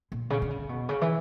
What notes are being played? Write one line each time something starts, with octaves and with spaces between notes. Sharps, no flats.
A#2
C#3
D3
C#3
B2
C#3
E3